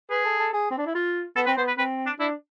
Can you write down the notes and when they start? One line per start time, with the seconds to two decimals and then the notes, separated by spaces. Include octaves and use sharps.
0.10 G#4 B4
0.25 A4
0.39 A4
0.53 G#4
0.71 C4
0.78 D4
0.86 E4
0.95 F4
1.36 B3 A4
1.46 C4 B4
1.57 B3 C5
1.68 B4
1.78 C4 B4
2.06 D4
2.19 D4 E4